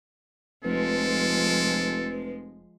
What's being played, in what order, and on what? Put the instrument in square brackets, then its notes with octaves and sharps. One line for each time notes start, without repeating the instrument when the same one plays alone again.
[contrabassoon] F1 [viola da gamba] F3 G#3 [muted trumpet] A4 [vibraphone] B4